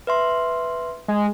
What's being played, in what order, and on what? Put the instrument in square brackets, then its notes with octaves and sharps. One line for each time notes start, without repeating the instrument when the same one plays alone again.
[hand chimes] B4 E5 C6
[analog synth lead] G#3